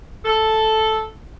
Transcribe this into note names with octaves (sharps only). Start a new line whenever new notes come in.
A4